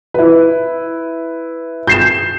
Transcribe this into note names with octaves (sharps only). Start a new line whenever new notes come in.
E4 B4
G6 C7 E7